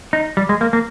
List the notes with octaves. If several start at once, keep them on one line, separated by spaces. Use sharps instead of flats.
D#4
G3
G#3
A#3
A#3